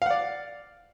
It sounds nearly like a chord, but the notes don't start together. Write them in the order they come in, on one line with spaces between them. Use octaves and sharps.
F5 F#5 D5